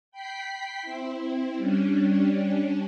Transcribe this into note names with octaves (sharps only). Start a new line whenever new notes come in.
G5 B5 G6 B6 C7
C4 E4
G3 C#4 D4